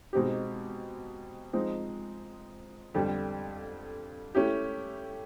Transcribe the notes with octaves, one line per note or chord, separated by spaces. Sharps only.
B2 G#3 C4 D#4 G4
F3 G#3 C4 D#4
F2 D3 G3
A3 C#4 E4 G4